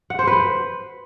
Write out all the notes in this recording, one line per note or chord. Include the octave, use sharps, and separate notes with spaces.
F#5
C5
B4